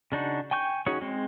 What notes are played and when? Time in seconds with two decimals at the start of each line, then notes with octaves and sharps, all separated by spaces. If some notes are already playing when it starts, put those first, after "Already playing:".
0.12 C#3 D4 D#4 F#4
0.51 G5 G#5 C#6 G6
0.86 C#4 D#4 F#4 G#4 C#5
1.01 G#3 C4